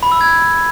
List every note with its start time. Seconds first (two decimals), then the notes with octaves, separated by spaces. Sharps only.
0.03 B5
0.12 E6
0.21 G#6